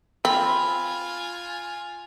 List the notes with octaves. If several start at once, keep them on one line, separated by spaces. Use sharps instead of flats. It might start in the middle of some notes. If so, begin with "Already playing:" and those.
C4 F4 G#5 B5